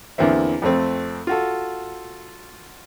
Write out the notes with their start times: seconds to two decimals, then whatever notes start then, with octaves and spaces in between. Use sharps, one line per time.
0.18 E2 D3 A#3 C4 E5
0.62 F2 A3 C4
1.27 F4 F#4 A4